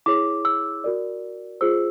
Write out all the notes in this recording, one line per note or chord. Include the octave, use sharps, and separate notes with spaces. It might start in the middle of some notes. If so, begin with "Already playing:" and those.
E4 G#4 C#5 D6
E6
F#4 A#4 D5
F4 G#4 C5 E6